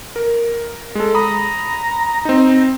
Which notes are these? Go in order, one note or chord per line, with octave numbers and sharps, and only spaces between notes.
A#4
G#3 A4
A#5 B5 D#6
C4 D#4